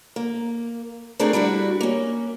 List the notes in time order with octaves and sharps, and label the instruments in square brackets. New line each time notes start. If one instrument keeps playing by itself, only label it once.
[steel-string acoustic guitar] A#3
A3 C4 D4 F4 G#4 A#4
G3 D4 E4 F#4
A#3 C#4